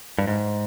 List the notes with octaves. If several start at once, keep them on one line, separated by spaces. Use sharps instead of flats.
G2
G#2